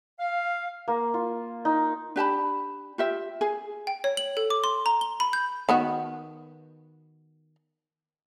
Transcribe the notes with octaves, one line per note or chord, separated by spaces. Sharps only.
F5
A#3
F4
D#4
D4 G4 A5 B5
F4 G4 E5
G#4
G5
C#5
F#7
A4
D6
C6
A#5
G7
B5
G6
D#3 B3 F#4